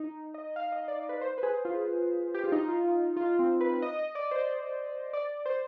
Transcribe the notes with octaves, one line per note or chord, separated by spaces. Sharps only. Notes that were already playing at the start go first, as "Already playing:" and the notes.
Already playing: D#4
D#5
F5
D#5
D5
B4
C5
B4
G#4
F4
G4
F4
D#4
F4
F4
F4
C4
B4
D#5
D#5
D5
C5
D5
C5